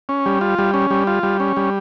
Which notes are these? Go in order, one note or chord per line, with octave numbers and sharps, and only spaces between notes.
C#4
G3
F4
G3
C#4
G3
F4
G3
C#4
G3